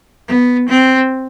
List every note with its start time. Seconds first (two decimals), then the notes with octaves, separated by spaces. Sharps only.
0.28 B3
0.68 C4